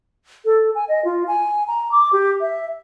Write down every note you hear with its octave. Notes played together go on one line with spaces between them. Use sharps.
A4
G#5
D#5
F4
G#5
A#5
D6
G4
E5